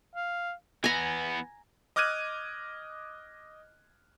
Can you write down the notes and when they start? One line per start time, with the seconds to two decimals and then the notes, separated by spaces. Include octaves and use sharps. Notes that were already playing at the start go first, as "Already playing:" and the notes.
0.15 F5
0.84 E3 B3 G#5 A#5
1.96 D#5 D6 F6 F#6 G#6 D#7